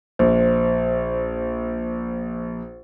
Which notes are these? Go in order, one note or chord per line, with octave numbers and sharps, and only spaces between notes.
A#1 C5